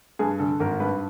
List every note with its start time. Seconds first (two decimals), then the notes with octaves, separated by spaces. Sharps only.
0.19 G2 G#4
0.39 D3 A4
0.60 G#1 A#4
0.80 G2 B4